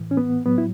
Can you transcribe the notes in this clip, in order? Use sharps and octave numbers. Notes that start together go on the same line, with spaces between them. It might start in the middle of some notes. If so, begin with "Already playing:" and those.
Already playing: A2 E3
C#4
B3
A2 F#3 B3
E4